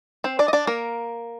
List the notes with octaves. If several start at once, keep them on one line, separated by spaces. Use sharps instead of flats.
C4 C5
D4 D5
D#5
D4 D5
A#3 A#4